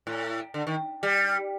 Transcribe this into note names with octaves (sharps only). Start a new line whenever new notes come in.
A2
D3
D#3
G3